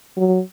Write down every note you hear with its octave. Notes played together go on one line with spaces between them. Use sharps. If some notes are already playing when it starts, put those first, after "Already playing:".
F#3